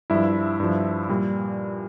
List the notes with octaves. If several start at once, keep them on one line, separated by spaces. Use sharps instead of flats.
G2 F3 E4 E5
G2 F3
A#2 G3